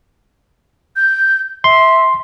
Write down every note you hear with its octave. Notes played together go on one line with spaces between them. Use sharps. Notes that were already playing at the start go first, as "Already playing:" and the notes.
G6
E5 C6